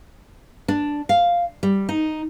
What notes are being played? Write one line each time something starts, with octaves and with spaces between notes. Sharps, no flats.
D4
F5
G3
D#4